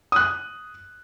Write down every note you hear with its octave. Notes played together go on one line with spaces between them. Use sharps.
D#6 F#6